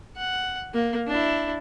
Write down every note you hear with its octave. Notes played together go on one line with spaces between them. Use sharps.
F#5
A#3
D4 E4